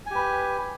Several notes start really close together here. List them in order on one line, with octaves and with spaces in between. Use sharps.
G#5 G4 B4